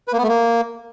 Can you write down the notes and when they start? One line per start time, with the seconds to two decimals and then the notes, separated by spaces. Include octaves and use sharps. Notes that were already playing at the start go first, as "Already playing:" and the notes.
0.08 B4
0.13 A#3
0.18 B3
0.23 A3
0.29 A#3